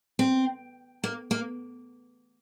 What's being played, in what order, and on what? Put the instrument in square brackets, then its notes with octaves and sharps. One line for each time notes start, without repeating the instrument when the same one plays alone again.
[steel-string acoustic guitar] C4
A#3
A#3